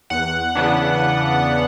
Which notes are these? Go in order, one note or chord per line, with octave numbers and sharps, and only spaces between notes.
E2 F#5
C#3 E3 B3 D4